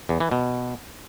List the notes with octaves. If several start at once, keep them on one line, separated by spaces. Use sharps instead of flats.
E2
E3
B2